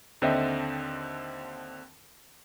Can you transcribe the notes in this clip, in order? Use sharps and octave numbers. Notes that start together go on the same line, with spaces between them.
D#2 D3 C4 D#5 E5 G5